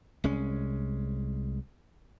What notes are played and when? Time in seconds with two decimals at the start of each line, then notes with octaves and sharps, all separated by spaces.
0.24 C2 G#3 C#4